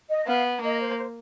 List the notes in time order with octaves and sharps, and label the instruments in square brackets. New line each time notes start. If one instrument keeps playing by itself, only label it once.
[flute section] D#5
[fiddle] B3 [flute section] F5
[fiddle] A#3 [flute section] D#5
[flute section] C5
C5